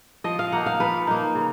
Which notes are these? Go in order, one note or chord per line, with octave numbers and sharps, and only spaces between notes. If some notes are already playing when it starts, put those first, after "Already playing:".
F3 D#5
F5
A#3 D#4 F#5
F5
F3 B4
A#3 D#4
C#3